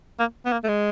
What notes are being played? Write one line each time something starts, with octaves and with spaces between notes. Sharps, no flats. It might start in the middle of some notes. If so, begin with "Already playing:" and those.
A#3
B3
A#3
A3
G#3